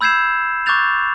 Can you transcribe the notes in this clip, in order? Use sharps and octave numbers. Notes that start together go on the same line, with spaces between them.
B5 E6 G6 G#6 C7 E7
C#6 D6 F#6 G6 A6 F7